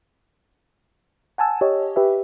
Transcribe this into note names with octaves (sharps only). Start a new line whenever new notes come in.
F#5 G#5 A5 E6
G4 C#5 D#5
G4 B4 E5